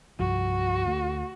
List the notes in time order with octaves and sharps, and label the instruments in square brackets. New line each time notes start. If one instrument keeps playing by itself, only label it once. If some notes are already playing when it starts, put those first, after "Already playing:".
[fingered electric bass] C2 G2 F3 [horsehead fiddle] F#4
[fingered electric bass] D2 A3